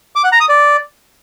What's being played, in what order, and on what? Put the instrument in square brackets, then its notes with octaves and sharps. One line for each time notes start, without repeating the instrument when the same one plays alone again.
[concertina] D6
F#5
A#5
D#6
D5